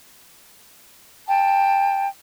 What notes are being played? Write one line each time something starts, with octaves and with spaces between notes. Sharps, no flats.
G5 A5